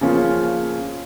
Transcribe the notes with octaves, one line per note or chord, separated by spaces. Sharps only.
C#3 F3 A#3 C#4 F4